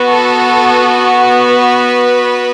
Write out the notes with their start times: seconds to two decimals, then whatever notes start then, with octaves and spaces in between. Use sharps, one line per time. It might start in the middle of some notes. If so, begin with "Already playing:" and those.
Already playing: B3 F#4
0.09 A4
1.47 B4